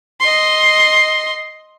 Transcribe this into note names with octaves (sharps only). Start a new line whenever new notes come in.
D#5 C6